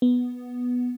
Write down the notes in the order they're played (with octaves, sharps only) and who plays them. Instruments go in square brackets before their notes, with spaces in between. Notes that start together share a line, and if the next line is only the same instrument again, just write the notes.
[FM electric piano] B3